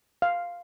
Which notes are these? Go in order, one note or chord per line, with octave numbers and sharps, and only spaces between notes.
F5